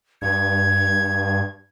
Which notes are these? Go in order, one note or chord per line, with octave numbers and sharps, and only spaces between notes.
G2 G#6